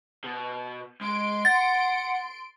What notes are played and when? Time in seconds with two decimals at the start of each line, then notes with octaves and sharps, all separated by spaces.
0.24 B2
1.01 G#3 C6 D7
1.45 F#5 A6